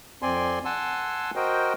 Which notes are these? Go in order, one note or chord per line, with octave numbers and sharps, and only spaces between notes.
F2 C4 D5 G#5 C6
F#5 G#5 A5 C6 E6
F#4 A#4 C5 D#5 G5